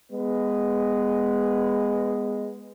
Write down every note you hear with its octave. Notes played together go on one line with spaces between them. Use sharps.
G#3 B3 B4